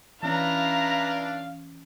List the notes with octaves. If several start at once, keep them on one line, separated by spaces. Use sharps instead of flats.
E3 C#4 D4 E4 B4 F5 A#5